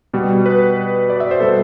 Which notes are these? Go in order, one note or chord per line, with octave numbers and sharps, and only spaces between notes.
B2 G3
B4
D5
E5
C5
B2 G3 A4